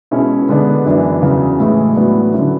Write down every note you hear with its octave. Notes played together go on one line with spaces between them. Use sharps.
B2 G#3 C#4 E4
D3 G#3 B3 D4
F#2 E3 B3 D4
E2 C#3 F#3
A2 E3 G#3
A2 F#3 B3 D4
D3 F#3 C#4 E4